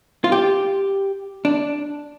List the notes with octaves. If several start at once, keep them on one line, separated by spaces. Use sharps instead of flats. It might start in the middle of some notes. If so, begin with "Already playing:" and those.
F4
G4
D4